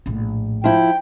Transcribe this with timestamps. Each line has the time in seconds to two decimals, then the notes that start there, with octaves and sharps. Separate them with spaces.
0.06 A#1 A2
0.64 F3 E4 G5